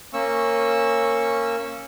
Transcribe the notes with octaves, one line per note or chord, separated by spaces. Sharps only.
A#3 C#4 C#6 E6